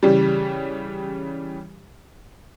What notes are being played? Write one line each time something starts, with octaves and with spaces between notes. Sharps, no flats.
C#3 E3 G3 G4